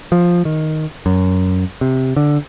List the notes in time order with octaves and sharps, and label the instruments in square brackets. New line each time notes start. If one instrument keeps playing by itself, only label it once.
[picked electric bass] F3
D#3
F#2
C3
D3